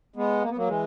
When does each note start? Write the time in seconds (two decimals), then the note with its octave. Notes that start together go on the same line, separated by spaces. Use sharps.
0.16 G#3 B3
0.42 A#3
0.50 B3
0.57 F#3 A#3
0.67 E3 G#3